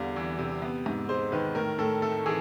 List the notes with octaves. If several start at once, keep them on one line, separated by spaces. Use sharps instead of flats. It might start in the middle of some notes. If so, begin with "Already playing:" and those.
Already playing: E2 D3 G3 F5
E3
C3
B3
G#2
G#3 C5
D#3 B4
A2 A#4
A2 A4
A3 A4
E3 G#4